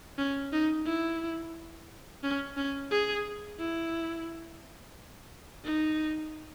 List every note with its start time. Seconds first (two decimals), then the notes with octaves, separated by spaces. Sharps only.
0.18 C#4
0.52 D#4
0.86 E4
2.23 C#4
2.57 C#4
2.91 G#4
3.58 E4
5.64 D#4